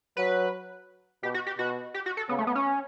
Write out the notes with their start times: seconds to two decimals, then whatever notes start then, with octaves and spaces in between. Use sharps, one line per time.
0.17 F#3 B4
1.23 B2 G4
1.34 F#4
1.46 G4
1.58 B2 F#4
1.94 G4
2.06 F#4
2.17 A4
2.29 C#3 B3
2.38 A3
2.47 B3
2.55 C#4